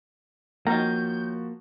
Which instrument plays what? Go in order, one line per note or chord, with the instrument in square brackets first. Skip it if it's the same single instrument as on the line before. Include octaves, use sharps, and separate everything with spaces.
[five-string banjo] D#3 C#4 A#5 [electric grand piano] F3 F#4 [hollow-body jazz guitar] A#3 [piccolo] G6